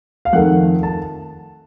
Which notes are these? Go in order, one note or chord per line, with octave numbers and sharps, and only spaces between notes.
F5
F2 D#3 A3 F#5
A5